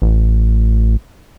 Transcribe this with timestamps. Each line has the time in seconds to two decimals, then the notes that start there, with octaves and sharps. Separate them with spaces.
0.02 A1